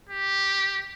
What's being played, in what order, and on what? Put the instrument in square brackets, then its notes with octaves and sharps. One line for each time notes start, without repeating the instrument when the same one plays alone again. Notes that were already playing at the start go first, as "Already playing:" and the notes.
[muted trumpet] G4